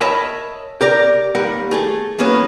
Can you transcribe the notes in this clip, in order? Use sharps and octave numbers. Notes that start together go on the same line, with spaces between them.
A#4 C#5 D#5 E5 A5 B5
G4 A#4 D5 A#5
D#2 G3 A#4 F#5
A3 G#4 A4
E3 F#3 A#3 B3 C#4